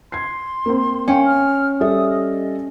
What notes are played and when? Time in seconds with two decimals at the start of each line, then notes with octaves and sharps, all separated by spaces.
0.12 C6 G#6 C7
0.66 A#3 C4
1.08 C#4 F5 G5
1.26 F6
1.81 G3 A4 E5 D#6
2.10 D#5